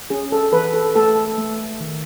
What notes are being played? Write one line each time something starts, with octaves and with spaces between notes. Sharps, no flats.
C#4 G#4
A4
E3 B4
A4
A3 A4
A3
D#3